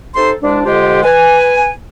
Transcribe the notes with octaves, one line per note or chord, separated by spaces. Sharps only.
C3 D#4 A4 C5 C6
C2 G#3 D4
F2 D3 G#3 F4 G4
B4 G#5